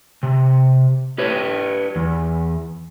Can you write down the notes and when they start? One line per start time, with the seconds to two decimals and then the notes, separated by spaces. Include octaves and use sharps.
0.23 C3
1.18 G4 B4 C#5
1.96 E2